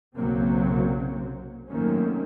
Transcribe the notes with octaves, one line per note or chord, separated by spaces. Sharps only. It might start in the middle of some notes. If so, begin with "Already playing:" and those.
F#1 B1 C3 F#3 A#3 C4
F#2 D#3 A3 A#3 C4 C#4